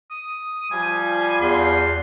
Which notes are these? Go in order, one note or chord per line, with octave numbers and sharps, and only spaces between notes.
D#6
F3 G3 G#5
E2 C6